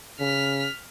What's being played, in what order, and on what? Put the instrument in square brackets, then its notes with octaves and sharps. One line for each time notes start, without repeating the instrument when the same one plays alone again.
[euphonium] C#3 [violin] F6 B6